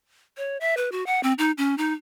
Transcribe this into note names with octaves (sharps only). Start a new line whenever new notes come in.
C#5
E5
B4
F#4
F#5
C4
D#4
C#4
D#4